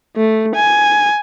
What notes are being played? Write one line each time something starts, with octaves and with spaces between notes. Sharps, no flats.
A3
G#5